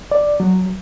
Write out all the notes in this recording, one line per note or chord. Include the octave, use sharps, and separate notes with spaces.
D5
F#3